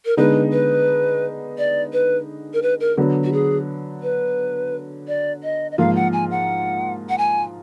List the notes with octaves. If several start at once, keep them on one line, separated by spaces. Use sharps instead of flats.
A#4
D3 G#3 B3 D#4 B4
B4
D5
B4
A#4
B4
A#4
D3 F#3 B3
F#4
G#4
B4
D5
D#5
D#5
G#2 F3 A#3 F4 F5
F#5
G#5
F#5
F#5
G#5